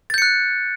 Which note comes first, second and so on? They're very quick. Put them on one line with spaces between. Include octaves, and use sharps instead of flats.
A6 G6 C#7 F#6